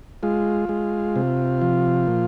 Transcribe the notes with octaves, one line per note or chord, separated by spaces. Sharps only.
G#3 F4
G#3
C3
F3
A#2